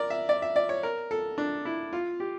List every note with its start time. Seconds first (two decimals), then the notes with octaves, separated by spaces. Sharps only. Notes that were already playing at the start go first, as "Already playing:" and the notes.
Already playing: A#4 D5
0.10 E5
0.29 D5
0.42 E5
0.56 D5
0.69 C#5
0.83 A#4
1.11 A4
1.38 D4
1.65 E4
1.93 F4
2.20 G4